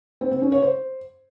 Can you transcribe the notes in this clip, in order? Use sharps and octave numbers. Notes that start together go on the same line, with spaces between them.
C4
C4
C#4
C#5
C5